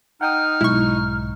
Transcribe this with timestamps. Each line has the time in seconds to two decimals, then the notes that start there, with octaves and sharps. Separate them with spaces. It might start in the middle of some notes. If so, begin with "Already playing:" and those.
0.21 D#4 F#5 G5 D#6 F6
0.61 B1 G#2 E4 C#6